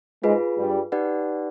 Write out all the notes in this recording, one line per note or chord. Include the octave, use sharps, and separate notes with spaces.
G#2 G#3 F4 G#4 B4
G2 G3
D#4 G4 B4 D5 F#5